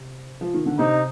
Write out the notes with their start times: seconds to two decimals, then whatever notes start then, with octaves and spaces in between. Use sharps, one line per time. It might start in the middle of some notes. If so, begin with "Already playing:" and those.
Already playing: C3
0.41 F3
0.54 D#3
0.66 D3
0.78 C3 D#4